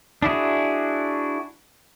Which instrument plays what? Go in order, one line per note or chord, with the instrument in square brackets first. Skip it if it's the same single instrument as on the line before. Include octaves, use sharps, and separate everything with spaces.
[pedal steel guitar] D4 E4 F#4 G#4